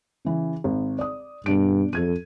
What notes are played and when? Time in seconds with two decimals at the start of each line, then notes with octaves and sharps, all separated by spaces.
0.25 C#3 E3
0.64 G#1
0.99 D5 D#6
1.46 G2 B2 D4 D7
1.93 F2 A4 G#6 D#7